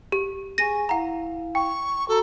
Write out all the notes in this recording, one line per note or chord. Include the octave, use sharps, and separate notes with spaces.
G4
G#4 G#5 C#6 A#6 D#7
E4 F5 F#5 A#5
G5 C#6
F#4 A4 A#5